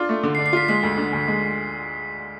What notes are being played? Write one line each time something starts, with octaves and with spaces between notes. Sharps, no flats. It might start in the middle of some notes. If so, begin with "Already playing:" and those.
Already playing: D4 F4
A3
D3
C7
D4
C7
F4 B6
G#3 B6
D2
D3
D2
G#3